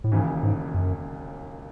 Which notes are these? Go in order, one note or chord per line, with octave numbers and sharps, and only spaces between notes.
A2
E1 D#2 G#2 C#3 E3
G#2
F#2